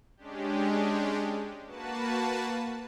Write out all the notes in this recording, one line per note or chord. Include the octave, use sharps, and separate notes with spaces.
G#3 C#4 D4 G4
A#3 F#4 B4 A5